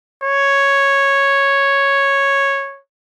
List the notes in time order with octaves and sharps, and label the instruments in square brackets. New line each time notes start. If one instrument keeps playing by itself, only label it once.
[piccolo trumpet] C#5